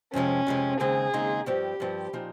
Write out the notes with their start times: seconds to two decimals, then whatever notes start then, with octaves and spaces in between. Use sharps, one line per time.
0.13 F2 C3 F3 G#3 C#4
0.47 F2 C3 F3 G#3
0.80 D#2 C#3 G#3 C4 D#4 G#4
1.13 D#2 C#3 G#3 C4 D#4
1.46 G2 F3 C4 G4
1.80 G2 F3 C4
2.13 A#2 F3 C4 D#4